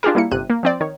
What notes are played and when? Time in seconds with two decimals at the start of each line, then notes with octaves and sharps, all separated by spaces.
0.03 D4 F4 G4 G#4 A#4
0.15 G3 A#3 E4 C#7
0.31 G1 C3 F#6 D#7
0.50 A#3
0.63 F3 C4 D5
0.80 D#3 C#5